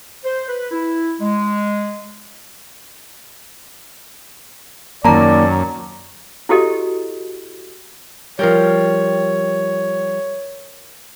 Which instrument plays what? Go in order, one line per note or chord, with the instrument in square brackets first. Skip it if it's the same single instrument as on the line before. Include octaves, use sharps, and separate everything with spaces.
[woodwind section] C5
B4
E4
G#3
[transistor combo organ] F#2 [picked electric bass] D#3 A#3 [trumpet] D5 [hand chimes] A5 A#5
[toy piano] E4 F#4 G4 A4 D#5
[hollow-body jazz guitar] F3 G3 [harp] A#4 G5 [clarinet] C#5